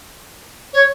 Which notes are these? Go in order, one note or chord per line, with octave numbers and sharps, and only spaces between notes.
C#5